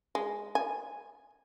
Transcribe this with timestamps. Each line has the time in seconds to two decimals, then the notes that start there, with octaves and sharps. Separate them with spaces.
0.15 G#3
0.55 G#5